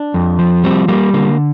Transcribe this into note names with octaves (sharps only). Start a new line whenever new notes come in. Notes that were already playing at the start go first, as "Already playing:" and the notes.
Already playing: D4
F2
F3
G3 C4
G3 A#3
D3 A#3